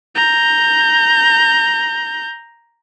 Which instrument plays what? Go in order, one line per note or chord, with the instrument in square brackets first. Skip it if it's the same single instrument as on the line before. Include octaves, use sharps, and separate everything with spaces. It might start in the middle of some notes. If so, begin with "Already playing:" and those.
[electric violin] A#5 G6